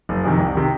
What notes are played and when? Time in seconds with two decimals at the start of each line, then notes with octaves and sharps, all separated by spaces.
0.09 F#1
0.24 F2 C3 D#3
0.40 C2
0.55 C3 D#3